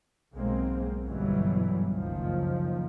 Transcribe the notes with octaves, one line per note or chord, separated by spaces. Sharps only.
B1 G#2 G#3 A#3 C4
G1 F#2 B2 E3 F#3 G3
F#1 C#2 D#3 F3